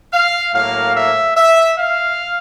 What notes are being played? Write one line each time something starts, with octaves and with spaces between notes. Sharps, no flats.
F5
A2 F#3 A#3 F5
E5
E5
F5